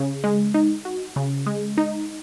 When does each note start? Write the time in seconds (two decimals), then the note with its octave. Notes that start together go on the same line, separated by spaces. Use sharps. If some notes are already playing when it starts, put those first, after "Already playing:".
Already playing: C#3
0.24 G#3
0.54 D#4
0.85 F#4
1.16 C#3
1.46 G#3
1.78 D#4